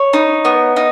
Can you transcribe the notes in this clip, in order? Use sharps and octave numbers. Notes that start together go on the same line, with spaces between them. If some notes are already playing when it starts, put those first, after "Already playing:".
Already playing: C#5
D#4
B3
D#4